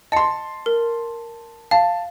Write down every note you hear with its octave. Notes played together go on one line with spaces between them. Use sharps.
D#5 A5 C6 C#7
A#4
F5 A5